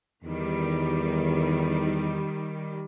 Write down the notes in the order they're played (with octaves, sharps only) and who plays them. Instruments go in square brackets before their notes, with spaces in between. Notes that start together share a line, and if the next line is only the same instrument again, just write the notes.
[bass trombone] E2 [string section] D#3 G3